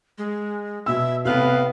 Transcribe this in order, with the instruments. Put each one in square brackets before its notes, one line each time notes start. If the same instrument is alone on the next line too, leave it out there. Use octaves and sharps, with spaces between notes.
[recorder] G#3
[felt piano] B2 E6 [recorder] E5
[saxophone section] A2 B4 F5 [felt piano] C3 [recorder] B3